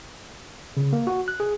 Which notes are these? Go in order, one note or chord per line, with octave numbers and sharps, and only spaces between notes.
C#3
A#3
F#4
F#6
G#4